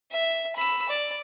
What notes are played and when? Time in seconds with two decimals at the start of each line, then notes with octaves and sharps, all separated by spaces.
0.11 E5
0.56 B5 E6
0.89 D5